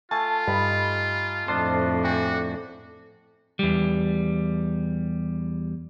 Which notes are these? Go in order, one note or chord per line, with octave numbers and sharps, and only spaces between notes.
A3 F4 G#5 A5
G2 D#4 B5
F2 A2 D4 C5 D#5 C6
F#4 D5 G5 G#5
E2 G3